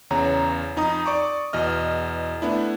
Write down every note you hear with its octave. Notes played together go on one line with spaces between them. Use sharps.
E2 C#3 C#5 A#5
F2 D#4 A#5 D#6
D5 C#6 D6
E2 B2 D#5 F6
A3 B3 D4 E4